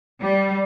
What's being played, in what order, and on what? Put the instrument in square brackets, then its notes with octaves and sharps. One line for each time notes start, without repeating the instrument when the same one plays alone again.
[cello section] G3